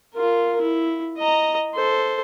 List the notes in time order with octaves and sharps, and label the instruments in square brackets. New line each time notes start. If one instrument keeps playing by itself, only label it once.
[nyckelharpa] F4 A#4
E4
D#5 A#5
A4 C5